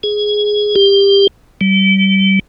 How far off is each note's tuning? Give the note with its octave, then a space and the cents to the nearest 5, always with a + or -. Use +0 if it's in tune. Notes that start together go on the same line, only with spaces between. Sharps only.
G#4 +5
G4 +20
G3 -30